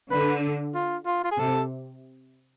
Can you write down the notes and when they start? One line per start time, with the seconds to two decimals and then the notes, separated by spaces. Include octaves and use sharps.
0.10 D3 B4
0.75 F4
1.06 F4
1.24 F4
1.31 G#4
1.38 C3 A4